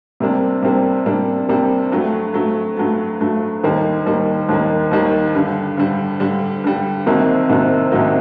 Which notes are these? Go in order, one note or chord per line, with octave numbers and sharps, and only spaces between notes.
C3 G3 A#3 D4
C3 G3 A#3 D4
C3 G3 A#3 D4
C3 G3 A#3 D4
G2 F#3 A3
G2 F#3 A3
G2 F#3 A3
G2 F#3 A3
D#2 D#3 G3 A#3
D#2 D#3 G3 A#3
D#2 D#3 G3 A#3
D#2 D#3 G3 A#3
G2 D3 G3
G2 D3 G3
G2 D3 G3
G2 D3 G3
C2 C3 D#3 F#3 A#3
C2 C3 D#3 F#3 A#3
C2 C3 D#3 F#3 A#3